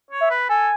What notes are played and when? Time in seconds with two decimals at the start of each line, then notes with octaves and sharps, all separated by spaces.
0.11 C#5
0.21 E5
0.30 B4
0.49 A4 G#5